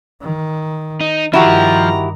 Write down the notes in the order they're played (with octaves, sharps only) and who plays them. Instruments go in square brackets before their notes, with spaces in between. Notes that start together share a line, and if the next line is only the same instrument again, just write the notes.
[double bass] D#3
[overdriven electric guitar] D#4
[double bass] G2 D#3 [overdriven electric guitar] F3 [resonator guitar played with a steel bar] E4 F#4 G4 [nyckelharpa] A#5